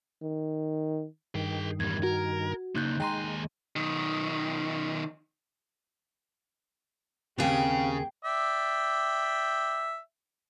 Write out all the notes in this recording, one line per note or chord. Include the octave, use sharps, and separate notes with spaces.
D#3
G2 D#3 G#4 G5
E2 G3 G#6
F#4 A#4
C#3 A#3 D#4 F#6 G6
D#2 G#3 G5 G#5 A#5 C6
B1 D#3
D#2 C#3 C4 G4 G#4 F5 D7
D5 E5 G5